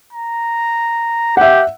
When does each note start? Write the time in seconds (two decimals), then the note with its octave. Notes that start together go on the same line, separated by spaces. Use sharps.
0.13 A#5
1.37 G4 E5 F#5